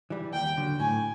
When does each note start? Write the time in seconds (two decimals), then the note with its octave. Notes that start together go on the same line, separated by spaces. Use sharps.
0.10 E3 G3
0.33 D#2 G5
0.57 D3 F#3
0.80 A2 G#5